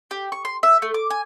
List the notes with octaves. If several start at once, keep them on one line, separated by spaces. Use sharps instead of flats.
G4
C#6
C6
E5
A3
D6
G#5